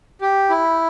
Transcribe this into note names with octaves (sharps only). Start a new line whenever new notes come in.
G4
E4